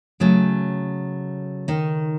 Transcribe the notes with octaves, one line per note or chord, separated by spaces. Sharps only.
C#3 F#3 A3 C#4
D#3 D#4